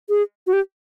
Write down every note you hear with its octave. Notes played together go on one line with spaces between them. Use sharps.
G#4
F#4
G4